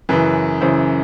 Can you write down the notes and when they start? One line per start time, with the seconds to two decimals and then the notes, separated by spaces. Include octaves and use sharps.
0.09 F#2 C#3 E3 B4
0.61 F#2 C#3 E3 C5